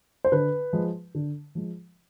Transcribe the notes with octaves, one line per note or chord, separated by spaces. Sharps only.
C5
D3 B4
F3 G#3
D3
F3 G#3